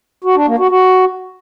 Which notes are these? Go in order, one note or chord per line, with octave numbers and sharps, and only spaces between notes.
F#4
D4
A#3
F#4
F#4